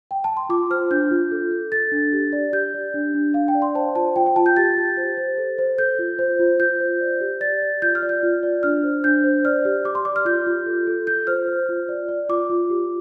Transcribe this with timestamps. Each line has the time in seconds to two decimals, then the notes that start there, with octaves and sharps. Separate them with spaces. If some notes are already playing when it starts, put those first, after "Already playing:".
0.11 G5
0.24 A5
0.37 C6
0.49 F4 D6
0.70 C5 F6
0.91 D4 G6
1.11 F4
1.32 A4
1.51 A4
1.72 A4 A6
1.92 D4
2.13 G4
2.33 D5
2.53 G4 G6
2.74 D5
2.94 D4
3.14 D4
3.34 D4 F5
3.48 G5
3.55 D5
3.62 C6
3.75 C5 A5
3.95 F4 A5
4.16 F4 G5
4.26 G5
4.36 F4 A5
4.46 G6
4.57 G4 A6
4.77 G4
4.97 C5
5.17 C5
5.38 A4
5.58 C5
5.78 A4 G6
5.99 F4
6.19 C5
6.39 F4
6.60 F4 G6
6.80 C5
7.01 D5
7.21 G4
7.41 D5 A6
7.62 D5
7.82 F4 G6
7.95 F6
8.02 D5
8.09 G6
8.23 F4
8.43 D5
8.63 D4 F6
8.84 C5
9.04 D4 G6
9.24 C5
9.45 D5 F6
9.65 G4
9.85 G4 D6
9.95 C6
10.05 D5 D6
10.16 F6
10.25 F4 G6
10.46 F4
10.66 A4
10.87 A4
11.07 F4 G6
11.27 C5 F6
11.47 C5
11.69 F4
11.89 D5
12.09 D5
12.29 F4 D6
12.50 F4
12.70 G4